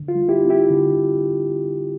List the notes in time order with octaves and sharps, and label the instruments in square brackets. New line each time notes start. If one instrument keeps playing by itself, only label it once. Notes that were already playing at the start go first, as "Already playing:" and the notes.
Already playing: [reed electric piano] D3
F4
G3
E4 G4
C4
E4 G4
D3